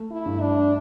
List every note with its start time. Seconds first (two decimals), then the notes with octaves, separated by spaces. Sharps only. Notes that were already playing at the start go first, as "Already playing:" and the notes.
Already playing: A3
0.11 E4
0.26 G2
0.41 D4